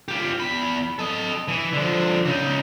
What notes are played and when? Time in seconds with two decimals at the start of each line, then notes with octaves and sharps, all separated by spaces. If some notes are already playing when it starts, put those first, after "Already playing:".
0.08 F4 G4
0.40 E2 B5
0.99 A4 D#5
1.48 E3
1.73 D3 F3
2.25 C#3 D#4